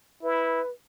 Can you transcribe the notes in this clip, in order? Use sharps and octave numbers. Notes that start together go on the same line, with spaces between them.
E4 B4